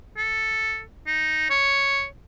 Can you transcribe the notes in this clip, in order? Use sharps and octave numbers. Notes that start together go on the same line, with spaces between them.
A4
D#4
C#5